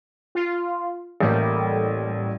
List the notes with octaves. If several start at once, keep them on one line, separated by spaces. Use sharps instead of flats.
F4
A1 A2 G3 A#3